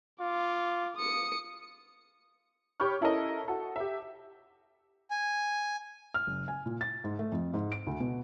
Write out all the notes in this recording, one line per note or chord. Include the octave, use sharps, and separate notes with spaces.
F4 D6
D#6 C#7
G4 C#5 B5 C#6 F6
C#4 E4 A4 A#4 D#5
F#4 A4
G4 E5
G#5
F6
F#1
G#5
A#2
A6
G#2
A3
F2
G#2
D7
D2
B2